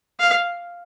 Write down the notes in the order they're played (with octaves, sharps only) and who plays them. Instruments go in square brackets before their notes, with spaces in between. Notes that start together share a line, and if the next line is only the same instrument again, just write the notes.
[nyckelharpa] F5